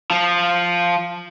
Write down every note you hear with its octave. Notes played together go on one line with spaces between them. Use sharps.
F3